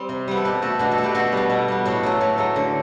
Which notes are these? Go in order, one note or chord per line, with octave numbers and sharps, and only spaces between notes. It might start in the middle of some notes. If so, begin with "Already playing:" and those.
Already playing: G3 C4
C3
G3 B3
A4
B2 G4 B4
A3 F#4 A4
B2 D4 F#4
F#4 A4
A3
G4 B4
B2 F#4 A4
G3 B3
B2
G3 B3
A2 F#4 A4
F#3 A3
A2
F#3 A3
D3